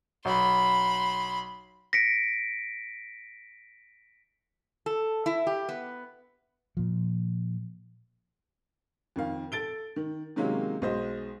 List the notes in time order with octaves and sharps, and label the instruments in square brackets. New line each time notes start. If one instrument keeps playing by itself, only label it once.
[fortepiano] B1 [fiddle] B5 C6
[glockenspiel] A#6 B6 C#7 D7
[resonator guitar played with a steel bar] A4
E4
G4
B3
[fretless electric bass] A#2 F3
[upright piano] F2 D#3 F5
A4 A6 D7 G7
D#3
C3 D#3 F#3 G#3 A#3 C#4
B1 G#3 C5 D#5